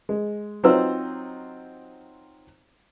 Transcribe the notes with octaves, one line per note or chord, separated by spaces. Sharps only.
G#3
F#3 C4 D#4 F4 C5 E6